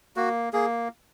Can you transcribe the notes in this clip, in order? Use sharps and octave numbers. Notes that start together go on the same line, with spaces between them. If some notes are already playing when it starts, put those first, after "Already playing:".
A#3 F#4
A#3 G#4